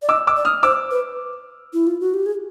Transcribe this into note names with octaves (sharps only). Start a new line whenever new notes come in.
D5
D#5 D6 E6
D6 E6
D5
D#6 F6
C5 D6 E6
B4
E4
F4
F#4
G4
G#4